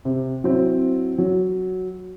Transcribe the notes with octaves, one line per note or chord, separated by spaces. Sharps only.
C3
F#3 C4 E4
F#3